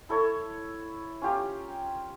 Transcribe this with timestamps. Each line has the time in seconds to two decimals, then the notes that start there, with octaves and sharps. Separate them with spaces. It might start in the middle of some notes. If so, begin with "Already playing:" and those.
0.09 E4 A4 C#5
1.21 C#4 F4 G4 A#5